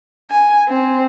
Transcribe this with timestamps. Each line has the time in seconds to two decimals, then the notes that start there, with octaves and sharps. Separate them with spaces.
0.31 G#5
0.69 C4